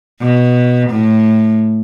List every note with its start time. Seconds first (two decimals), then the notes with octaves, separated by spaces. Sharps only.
0.21 B2
0.90 A2